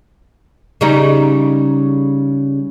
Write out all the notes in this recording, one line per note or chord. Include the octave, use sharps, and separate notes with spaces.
C#3 G3 D#4